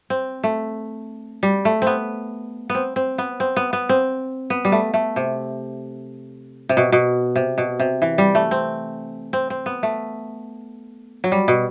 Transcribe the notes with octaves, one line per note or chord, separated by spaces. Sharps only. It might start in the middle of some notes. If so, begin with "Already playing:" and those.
C4
A3
G3
A3
B3 C4
B3
C4
C4
B3
C4
B3
B3
C4
B3
G3
A3
A3
C3
C3
B2
B2
C3
B2
C3
E3
G3
A3
C4
C4
C4
B3
A3
F#3
G3
B2